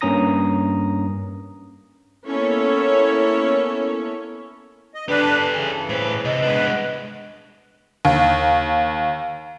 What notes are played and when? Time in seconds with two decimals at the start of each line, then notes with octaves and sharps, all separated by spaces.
0.01 G2 A#3 C#4 A#5 D#6 A#6
2.27 A#3 B3 C#4 E4 A4 C#5
4.94 D#5
5.09 D4 G4 A4 B4
5.54 C#3 E3 G#5
5.89 A2 B4 C5
6.25 C3 D#5
6.42 G#3 B3 D4 B4
8.05 D#2